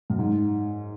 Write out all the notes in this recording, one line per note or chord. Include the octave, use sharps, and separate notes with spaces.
F#2
G#2